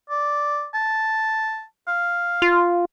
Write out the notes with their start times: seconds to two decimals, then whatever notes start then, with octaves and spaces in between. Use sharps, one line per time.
0.10 D5
0.74 A5
1.88 F5
2.42 F4